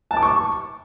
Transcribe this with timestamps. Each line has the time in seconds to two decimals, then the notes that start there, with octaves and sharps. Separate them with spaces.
0.11 A5
0.17 D6
0.23 C#6